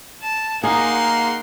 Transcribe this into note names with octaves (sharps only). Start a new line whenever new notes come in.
A5
A#3 D#4 G#4 A#4 F#5 C6